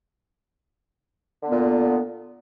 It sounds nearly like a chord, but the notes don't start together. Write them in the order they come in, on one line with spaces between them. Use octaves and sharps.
D3 B3 A#2